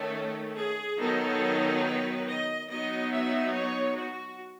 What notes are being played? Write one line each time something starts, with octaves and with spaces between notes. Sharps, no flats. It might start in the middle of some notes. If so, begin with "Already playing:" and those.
Already playing: D#3 A3 C#4 A4
G#4
D#3 F#3 B3 D#4 A4
B4
D#5
F#3 B3 D#4 D#5
E5
C#5
F#4